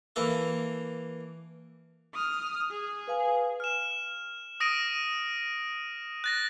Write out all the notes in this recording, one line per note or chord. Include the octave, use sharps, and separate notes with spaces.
E3 A#3 A4
D#6 F6
G#4
B4 F5 G#5
F6 E7
D#6 A#6 D7 D#7
F#6 A6 A#6